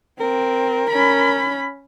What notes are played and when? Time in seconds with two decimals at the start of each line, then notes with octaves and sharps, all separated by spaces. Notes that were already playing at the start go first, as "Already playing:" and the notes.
0.20 C4 A#4
0.90 C#4 B5